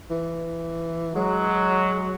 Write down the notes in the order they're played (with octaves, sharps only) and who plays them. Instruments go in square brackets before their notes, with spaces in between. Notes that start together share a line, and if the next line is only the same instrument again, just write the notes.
[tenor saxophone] E3
[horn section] F#3 [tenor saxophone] G#3